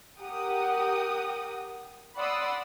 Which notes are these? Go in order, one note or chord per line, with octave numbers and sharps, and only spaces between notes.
G4 A#4 F#5 D#6
D5 F#5 B5 C6 D#6 E6